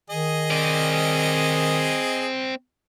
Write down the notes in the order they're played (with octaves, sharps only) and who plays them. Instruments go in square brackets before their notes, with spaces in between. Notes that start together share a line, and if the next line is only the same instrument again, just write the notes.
[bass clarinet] D#3 [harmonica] G#4 D#5
[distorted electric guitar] C4 D5